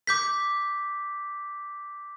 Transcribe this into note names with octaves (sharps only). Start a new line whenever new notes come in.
D6 G6 B6